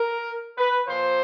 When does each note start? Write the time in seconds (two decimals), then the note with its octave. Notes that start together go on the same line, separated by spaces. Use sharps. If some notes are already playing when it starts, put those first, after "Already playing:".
Already playing: A#4
0.58 B4
0.87 A#2 F3 C5